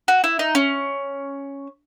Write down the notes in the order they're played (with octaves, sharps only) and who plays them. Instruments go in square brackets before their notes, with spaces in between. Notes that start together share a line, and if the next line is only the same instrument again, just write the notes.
[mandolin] F#4
E4
D#4
C#4